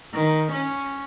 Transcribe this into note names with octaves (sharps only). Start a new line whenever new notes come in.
D#3
C#4